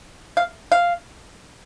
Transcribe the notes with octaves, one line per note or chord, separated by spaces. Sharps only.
F5
F5